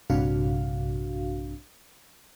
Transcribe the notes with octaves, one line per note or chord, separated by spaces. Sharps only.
A#1 G2 C3 D4 F#4 F5